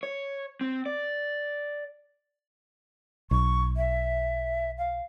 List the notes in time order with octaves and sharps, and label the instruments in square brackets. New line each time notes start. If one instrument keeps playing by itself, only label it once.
[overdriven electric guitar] C#5
C4
D5
[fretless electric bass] B1 [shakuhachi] C#6
[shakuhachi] E5
F5